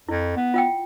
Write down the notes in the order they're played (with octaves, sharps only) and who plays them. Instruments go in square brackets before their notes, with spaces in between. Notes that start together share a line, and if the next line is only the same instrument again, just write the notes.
[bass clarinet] F2 [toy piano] E4
[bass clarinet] B3
[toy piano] F4 F#5 G5